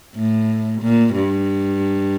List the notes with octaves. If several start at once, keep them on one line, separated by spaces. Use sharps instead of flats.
A2
A#2
G2